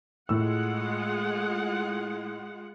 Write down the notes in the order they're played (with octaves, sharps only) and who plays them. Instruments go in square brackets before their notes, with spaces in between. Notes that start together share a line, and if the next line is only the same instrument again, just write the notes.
[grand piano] A2 E6 [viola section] G#3 F4 F#5